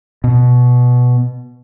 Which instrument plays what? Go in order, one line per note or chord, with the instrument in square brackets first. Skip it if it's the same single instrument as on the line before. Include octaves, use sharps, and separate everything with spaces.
[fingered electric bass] B2